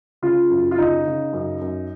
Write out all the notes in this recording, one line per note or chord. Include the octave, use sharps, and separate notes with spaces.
C#3 F4
F#2
F4
C#3 D#4
C#3
F#2
F#2